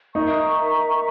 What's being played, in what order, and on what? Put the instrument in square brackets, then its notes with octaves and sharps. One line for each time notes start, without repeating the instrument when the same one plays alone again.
[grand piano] D#4 [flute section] A#4 E5 A#5 C#6